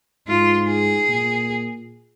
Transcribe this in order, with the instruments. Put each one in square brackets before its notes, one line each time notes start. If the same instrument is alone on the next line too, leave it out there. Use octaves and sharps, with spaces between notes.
[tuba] G#2 [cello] F4
[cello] G#4
[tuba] A#2